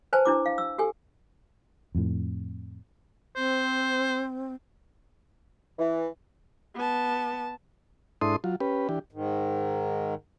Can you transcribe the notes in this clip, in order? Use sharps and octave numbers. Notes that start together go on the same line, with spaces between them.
B4 C5 G#5 A5
D4 E4 D6
F5
E6
G4 A4 G#5
F2 A2
C4 C5
E3
B3 A5
G#2 D4 E4 A4 C6 D#6
F#3 F4
C#4 G4 B4
E3 D4 G4
G#2 D#3